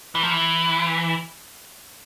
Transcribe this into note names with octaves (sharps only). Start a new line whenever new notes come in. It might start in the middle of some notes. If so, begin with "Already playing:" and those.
E3
F3
E3